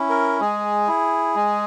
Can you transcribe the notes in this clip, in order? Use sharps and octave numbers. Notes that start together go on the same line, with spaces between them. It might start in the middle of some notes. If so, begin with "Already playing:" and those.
Already playing: C#4 E4
A#4
G#3 G#4
E4
G#3